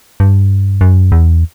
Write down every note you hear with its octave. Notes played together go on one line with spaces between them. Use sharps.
G2
F#2
E2